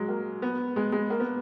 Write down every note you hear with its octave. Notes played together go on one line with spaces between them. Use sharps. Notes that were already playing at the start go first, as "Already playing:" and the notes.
Already playing: F#3 G#3
A#3
B3
G#3
G#3
A#3
B3